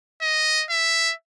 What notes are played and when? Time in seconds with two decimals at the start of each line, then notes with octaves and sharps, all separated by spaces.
0.22 D#5
0.70 E5